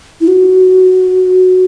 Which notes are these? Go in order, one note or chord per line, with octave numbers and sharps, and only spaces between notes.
E4
F#4